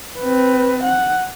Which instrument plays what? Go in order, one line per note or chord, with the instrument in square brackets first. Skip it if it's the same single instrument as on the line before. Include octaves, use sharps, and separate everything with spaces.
[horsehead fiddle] C4 B4
F#5